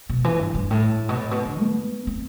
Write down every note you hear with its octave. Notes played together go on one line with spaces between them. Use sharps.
B2
E3
G2
G2
A2
B2
A2
B2
D3
B3
C4